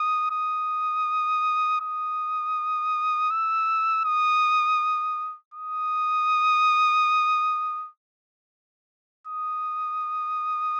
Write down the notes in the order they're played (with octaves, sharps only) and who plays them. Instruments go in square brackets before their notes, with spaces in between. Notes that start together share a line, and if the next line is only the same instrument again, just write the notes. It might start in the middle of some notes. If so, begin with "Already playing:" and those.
Already playing: [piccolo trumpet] D#6
D#6
D#6
E6
D#6
D#6
D#6